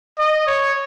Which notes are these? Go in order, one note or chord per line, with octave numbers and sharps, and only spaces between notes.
D#5
C#5